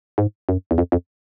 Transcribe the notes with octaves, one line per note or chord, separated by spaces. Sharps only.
G#2
F#2
E2
F2
F2